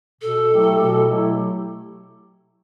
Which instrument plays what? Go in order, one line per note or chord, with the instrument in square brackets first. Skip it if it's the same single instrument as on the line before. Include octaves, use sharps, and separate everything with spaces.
[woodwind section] B2 [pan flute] A4
[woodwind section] F#3 A3 E4 G4
B2
F#3 A3 E4 G4